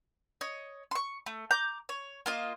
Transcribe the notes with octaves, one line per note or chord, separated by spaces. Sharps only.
C#5 D#5
C6 C#6
A3
A#5 D6 G6
C#5
A#3 F4 D#5